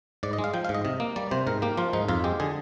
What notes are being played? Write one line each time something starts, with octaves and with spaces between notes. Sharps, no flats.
G#2 D5
D#5
G#3
F5
F3 G5
F5
G#2
D#5
C3 D#5
A#3
G3 D5
C3 C5
G#2 A#4
A#3 G4
F3 F4
G#2 D#4
F2 F4
G#3 G4
D3 G#4